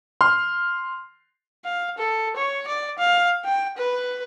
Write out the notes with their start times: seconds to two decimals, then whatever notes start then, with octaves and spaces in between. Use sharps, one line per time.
0.21 C6 F6
1.65 F5
1.98 A4
2.36 C#5
2.68 D5
2.99 F5
3.45 G5
3.77 B4